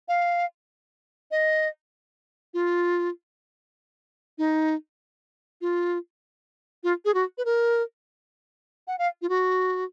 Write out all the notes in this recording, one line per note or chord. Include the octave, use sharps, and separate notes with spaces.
F5
D#5
F4
D#4
F4
F4
G#4
F#4
B4
A#4
F#5
F5
F4
F#4